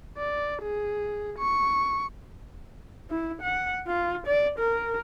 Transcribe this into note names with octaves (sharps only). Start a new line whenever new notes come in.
D5
G#4
C#6
E4
F#5
F4
D5
A#4